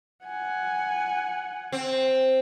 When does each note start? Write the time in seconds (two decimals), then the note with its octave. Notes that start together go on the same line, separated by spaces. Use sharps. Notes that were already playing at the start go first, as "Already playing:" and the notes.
0.25 F#5 G#5
1.72 C4